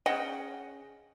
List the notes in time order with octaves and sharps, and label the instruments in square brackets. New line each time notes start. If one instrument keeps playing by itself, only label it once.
[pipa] C#3 D#5 F#5 G5